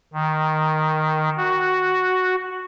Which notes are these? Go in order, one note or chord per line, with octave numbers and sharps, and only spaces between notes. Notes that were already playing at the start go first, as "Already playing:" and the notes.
D#3
F#4